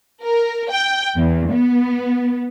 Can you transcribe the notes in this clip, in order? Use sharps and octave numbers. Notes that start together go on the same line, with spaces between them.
A#4
G5
E2
B3